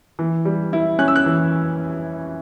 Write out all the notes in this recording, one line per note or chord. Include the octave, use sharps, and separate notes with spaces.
E3
G3
E4
C#4 F#6
E6
F#6
E3